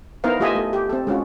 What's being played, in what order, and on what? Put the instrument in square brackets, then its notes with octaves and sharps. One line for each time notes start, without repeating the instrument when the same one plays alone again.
[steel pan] B3 D#4 E4 A#4 C5 F5
A3 F4 G4 D#5 E5 G#5
A3
G4
C4 A4
G#3 C#4 F4 F#4